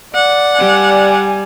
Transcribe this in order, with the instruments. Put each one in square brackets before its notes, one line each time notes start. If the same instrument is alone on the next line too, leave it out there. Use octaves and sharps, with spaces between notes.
[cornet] D5 [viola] F#5
[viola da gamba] G3 [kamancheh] G#5